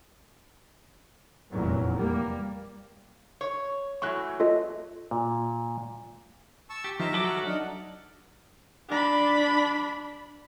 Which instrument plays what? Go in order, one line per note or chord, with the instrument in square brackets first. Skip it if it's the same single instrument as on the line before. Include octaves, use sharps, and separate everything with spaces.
[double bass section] F1 E2 A#2 F#3
G3 A#3
[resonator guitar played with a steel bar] C#5
[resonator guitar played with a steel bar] E3 F#3 A3 [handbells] C#6 F#6
[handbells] F4 A4 D#5
[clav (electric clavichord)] A#2
[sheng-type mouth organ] A5 C#6 E6
[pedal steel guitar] G4
[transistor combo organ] D#3 F3 [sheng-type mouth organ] E5 A#5
[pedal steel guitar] F3 A4 D6 [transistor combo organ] F#3
[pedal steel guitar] A4 F#5 F6
[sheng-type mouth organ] D4 D#4
[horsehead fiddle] D4 B5